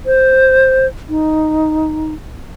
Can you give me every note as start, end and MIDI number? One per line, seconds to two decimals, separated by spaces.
0.06 0.86 72
1.09 2.14 63